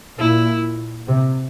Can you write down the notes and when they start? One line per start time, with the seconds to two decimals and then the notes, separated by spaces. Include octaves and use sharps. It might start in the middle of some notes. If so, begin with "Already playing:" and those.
0.18 A#2 E4
1.08 C3